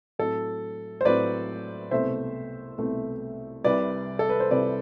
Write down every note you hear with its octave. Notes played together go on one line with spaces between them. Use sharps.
A2 F#3 C4 A4
C5
A2 F#3 C4 B4 D5
C2 B2 A3 C4 C5 E5
C2 B2 A3 C4
C2 C3 G3 C4 B4 D5
A4
B4
C5
C2 C3 G3 C4 B4 D5